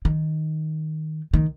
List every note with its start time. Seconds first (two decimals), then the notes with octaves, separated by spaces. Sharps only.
0.05 D#3
1.34 D#3